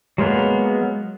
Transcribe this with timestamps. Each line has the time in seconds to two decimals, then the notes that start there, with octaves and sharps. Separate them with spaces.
0.18 F#3 G#3 A#3 B3